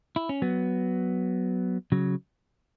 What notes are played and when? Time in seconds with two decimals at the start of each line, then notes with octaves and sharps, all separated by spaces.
0.16 E4
0.29 C#4
0.42 F#3 B3
1.92 C#3 F#3